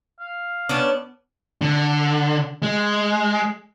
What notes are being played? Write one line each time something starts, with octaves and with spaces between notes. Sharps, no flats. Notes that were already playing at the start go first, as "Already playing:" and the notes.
F5
B3 C#4 D4
D3
G#3